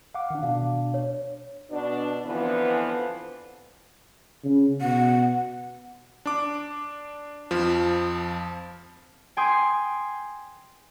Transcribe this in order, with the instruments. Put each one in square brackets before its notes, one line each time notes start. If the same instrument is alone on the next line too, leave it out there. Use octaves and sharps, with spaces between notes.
[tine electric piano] F5 F#5 D6
D#3 D4
[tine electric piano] B2 D4 [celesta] F5
[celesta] C#5
[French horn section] B2 D4
D3 E3 F3 B3 C4 B4
[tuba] C#3
[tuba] B2 [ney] F#5
[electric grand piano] D4 D6
F2 F3
[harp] G5 G#5 C6 D#6